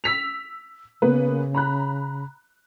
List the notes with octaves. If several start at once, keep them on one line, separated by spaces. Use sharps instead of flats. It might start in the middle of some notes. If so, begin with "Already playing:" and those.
E6 B6 F7
C#3 A#3 B3 B4
A#5 B5 F#6